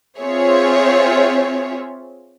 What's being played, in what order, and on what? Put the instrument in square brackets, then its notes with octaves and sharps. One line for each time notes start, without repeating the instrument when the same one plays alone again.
[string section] C4 F4 G#4 C#5 E5